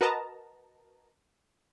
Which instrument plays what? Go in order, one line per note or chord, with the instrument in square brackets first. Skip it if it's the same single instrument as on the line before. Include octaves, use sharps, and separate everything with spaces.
[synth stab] F#4 A#4 B4 D#5 A5 A#5